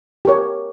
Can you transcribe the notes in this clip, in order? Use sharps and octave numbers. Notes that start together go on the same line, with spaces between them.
G4 A#4 C#5